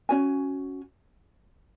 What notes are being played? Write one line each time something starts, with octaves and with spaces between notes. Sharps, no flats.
C#4 F#4 C#5 G#5